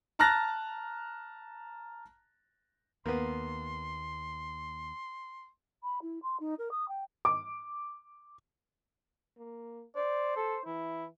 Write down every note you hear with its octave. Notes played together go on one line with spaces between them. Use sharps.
A5 A#5 F6 F#6 A6 A#6
D#2 A#3 B3 C6
B5
E4
C6
D#4
A#4
D#6
G5
D6
A#3
C5 D5
A4
E3 E4